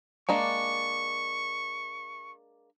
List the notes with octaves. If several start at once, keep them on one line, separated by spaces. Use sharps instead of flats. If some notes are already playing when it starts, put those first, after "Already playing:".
G#3 A#3 D4 C#6